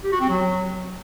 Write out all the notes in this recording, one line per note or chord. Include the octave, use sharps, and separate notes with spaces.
G4
F#4
C4
F#3